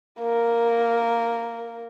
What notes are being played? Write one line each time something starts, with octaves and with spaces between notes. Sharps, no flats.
A#3 A#4